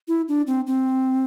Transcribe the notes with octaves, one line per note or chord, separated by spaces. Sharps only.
E4
D4
C4
C4